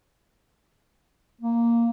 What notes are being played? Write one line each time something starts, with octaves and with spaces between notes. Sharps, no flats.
A#3